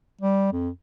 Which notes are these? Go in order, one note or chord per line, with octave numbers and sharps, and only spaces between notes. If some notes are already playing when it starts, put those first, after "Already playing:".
G3
F2